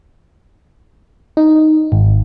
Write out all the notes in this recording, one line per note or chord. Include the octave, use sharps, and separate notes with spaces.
D#4
G#1